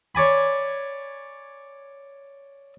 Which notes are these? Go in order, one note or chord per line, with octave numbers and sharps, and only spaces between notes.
C#5 D5 G#5 B5